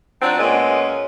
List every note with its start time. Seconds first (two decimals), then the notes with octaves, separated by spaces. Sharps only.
0.22 F#3 C4 D4 F4 F#4
0.39 A#2 G#3 B3 C#4